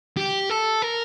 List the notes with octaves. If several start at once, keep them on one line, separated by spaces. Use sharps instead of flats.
G4
A4
A#4